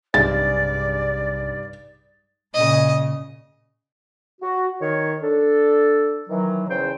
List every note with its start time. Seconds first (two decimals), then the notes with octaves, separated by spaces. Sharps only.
0.14 B1 G2 C3 D#4 G#4 D5 A6
2.54 A#2 C#3 D#5
4.42 F#4
4.81 D#3 C#5
5.22 D4 A4
6.30 D#3 E3 F#3
6.69 E2 C#3 C5 G5